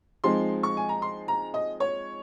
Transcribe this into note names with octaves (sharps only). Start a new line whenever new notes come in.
F3 G#3 C4 D#4 C6
C#6
G#5
A#5
C6
A#5
D#5
C#5